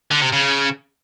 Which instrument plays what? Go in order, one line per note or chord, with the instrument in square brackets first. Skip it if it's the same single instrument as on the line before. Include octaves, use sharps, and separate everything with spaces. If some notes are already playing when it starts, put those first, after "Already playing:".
[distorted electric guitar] D3
C3
C#3